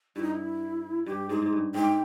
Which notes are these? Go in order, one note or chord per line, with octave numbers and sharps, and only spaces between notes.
G2 E4
D#4
E4
G2 G4
G#2 G#4
G#2
G2
G#2 G5